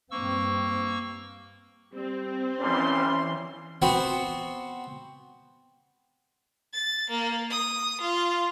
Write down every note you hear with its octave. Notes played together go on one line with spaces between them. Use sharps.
G2 A#3 C4 C#6 E6
G3 C4
B1 A#2 E3 G3 C#4 C6
B3 C4 F#4
A6
A#3
D#6
F4